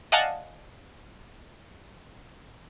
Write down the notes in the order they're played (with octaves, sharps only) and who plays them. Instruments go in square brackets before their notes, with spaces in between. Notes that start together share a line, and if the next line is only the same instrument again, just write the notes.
[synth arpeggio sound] D5 D#5 F5 F#5 G#5 A5